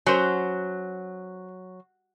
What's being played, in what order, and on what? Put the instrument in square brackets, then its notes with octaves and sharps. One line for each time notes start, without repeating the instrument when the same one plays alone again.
[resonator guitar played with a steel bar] F#3 [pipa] C#4 C5